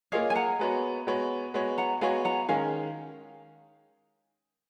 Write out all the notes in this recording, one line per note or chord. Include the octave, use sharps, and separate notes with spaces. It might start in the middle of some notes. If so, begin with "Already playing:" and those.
A#3 F4 G#4 C#5 D#5 F5
G#5
F#5 A#5
G#3 B3 F#4 C#5
G#3 B3 F#4 C#5
G#3 B3 F#4 C#5
F#5 A#5
G#3 B3 F#4 C#5 F5 G#5
F#5 A#5
D#3 G#3 C#4 F5 G#5